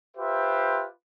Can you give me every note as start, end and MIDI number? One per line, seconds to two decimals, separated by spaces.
0.17 0.85 65
0.17 0.85 67
0.17 0.85 71
0.17 0.85 72
0.17 0.85 76